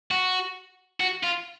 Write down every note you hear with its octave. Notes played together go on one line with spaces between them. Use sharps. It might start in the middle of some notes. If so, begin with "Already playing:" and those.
F#4
F#4
F4